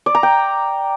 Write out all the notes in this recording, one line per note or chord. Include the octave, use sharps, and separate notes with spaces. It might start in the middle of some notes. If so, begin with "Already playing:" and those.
D5
A#5
G5